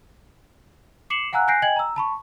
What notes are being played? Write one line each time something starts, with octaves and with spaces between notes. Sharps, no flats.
D6 C7 C#7 E7 F#7
F5 F#5 G#5 A#5 E6 F#6
G#5 F#6 G6 A#6 C7 D7
D#5 G5 G#5 G#6 F#7
A#5 E6
A5 B5 C#6